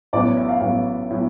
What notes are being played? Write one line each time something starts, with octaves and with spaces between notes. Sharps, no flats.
A1 A2 F#3 B3 D5
C#5
E5
F5
A1 A2 F#3 B3 F5
A2 F#3 B3